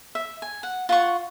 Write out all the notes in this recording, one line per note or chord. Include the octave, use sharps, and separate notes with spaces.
E5
G#5
F#5
F4 F#5 C#6